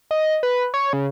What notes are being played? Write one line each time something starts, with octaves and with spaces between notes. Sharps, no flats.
D#5
B4
C#5
C#3